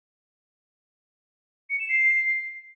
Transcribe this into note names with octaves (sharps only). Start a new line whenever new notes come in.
C#7
E7
C7